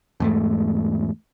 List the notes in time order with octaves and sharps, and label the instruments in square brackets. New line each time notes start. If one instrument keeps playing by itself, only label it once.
[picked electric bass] E2 G#2 A3